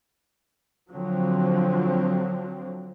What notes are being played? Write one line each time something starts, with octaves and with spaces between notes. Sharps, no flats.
D3 F3 F#3 C4